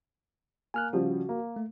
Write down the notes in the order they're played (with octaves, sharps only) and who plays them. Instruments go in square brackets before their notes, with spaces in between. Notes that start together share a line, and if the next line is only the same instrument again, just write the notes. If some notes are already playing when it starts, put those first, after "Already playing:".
[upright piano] A#3 [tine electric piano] G#5 F6 F#6
[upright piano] C#3 F3 G3 [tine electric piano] F#4
[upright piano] A#3
[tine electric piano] A3